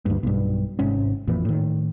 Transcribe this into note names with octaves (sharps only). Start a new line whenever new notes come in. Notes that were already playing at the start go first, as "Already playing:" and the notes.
D2 G2
B1 G2
G#1 G#2 C3 C#4
A1 F2 A#2 E3
A2 D#3